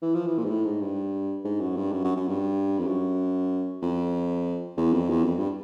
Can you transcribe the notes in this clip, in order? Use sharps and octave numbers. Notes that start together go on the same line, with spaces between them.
E3
F3
E3
A#2
G#2
A2
G#2
G2
G#2
F#2
G2
F#2
F#2
F#2
G2
F2
F#2
F2
E2
F2
E2
F2
G2